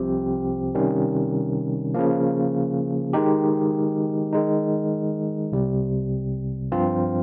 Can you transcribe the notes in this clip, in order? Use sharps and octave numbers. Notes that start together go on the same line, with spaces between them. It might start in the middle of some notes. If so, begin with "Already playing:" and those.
Already playing: C2 C3 F3 C4 G4
C3 D#3 G3 C#4
C#3 F3 A#3
D#3 G#3 D#4 G4
D#3 G#3 D#4
C2 C3 G3
G2 F3 C4 F4